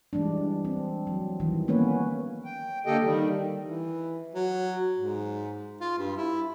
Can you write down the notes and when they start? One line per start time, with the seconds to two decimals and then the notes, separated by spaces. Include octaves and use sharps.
0.13 E3 G3 G#3 D4
0.65 C4
1.07 F#3
1.40 D#3 E3 G3
1.68 A#3 B3 C#4 B4 C#5
2.45 G5
2.86 D3 A#3 G4 A4 D#5 G5
3.03 D#3 G3
3.63 E3
4.35 F#3
4.97 G#2
5.81 F4
5.98 G2
6.17 E4